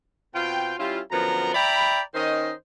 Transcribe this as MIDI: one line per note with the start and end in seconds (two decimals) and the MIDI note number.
0.35 0.75 47
0.35 0.75 60
0.35 0.75 65
0.35 0.75 77
0.35 0.75 79
0.78 1.00 55
0.78 1.00 61
0.78 1.00 64
0.78 1.00 65
1.12 1.53 42
1.12 1.53 50
1.12 1.53 53
1.12 1.53 59
1.12 1.53 70
1.12 1.53 82
1.55 2.01 74
1.55 2.01 76
1.55 2.01 79
1.55 2.01 82
1.55 2.01 83
2.15 2.53 51
2.15 2.53 61
2.15 2.53 63
2.15 2.53 72
2.15 2.53 75